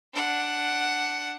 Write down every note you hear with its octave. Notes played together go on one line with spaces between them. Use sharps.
D4 F#5